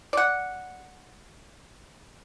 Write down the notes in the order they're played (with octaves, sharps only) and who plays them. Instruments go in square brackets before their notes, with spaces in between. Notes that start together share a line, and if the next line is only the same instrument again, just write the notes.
[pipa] D5 F#5